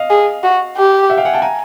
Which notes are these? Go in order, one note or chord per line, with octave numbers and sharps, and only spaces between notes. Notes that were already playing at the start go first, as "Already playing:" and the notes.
Already playing: D#5 F5
G#4
F#4
G4
E5 F#5
F5 G5
F#5 G#5
G5 A5
G#5 A#5